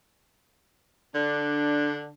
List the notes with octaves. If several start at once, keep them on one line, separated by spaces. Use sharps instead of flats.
D3 D4